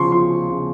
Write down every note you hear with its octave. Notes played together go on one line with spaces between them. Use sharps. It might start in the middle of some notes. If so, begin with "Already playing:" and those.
Already playing: C#3 F3 C6 C#6
F3 C6
C#3